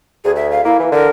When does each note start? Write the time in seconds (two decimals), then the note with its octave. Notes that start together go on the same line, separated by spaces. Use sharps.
0.25 D2 G#4
0.36 E5
0.51 F5
0.65 A#3 E4
0.80 E3
0.92 D3 A#4